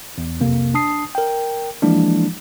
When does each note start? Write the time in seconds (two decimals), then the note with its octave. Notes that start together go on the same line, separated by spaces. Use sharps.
0.18 E2
0.40 B1 F2 C3 A#3
0.74 D4 A5 D#6 C7
1.15 A#4 G5
1.82 E3 F3 G#3 A#3 D4 E4